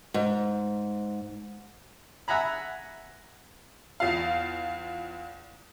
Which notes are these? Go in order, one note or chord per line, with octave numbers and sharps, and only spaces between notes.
G#2
E5 F#5 G#5 A#5 B5
E2 F4 F5